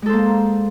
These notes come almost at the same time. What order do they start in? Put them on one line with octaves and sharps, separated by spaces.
G#3 A4 C5 A#3